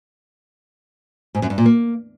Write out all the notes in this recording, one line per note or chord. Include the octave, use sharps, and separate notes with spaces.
G#2
F#2
G2
A#2
A#3